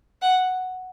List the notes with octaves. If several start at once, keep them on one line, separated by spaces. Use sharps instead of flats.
F#5